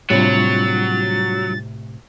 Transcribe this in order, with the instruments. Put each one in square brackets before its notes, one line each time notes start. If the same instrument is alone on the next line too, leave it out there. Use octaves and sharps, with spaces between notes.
[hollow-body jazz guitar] A2 C3 [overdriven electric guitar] F#3 [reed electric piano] G3 D4 F4 [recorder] A6